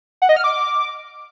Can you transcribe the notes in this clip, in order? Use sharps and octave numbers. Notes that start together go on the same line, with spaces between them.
F#5
D#5
F6
D6